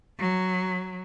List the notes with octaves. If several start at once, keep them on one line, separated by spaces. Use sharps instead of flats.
F#3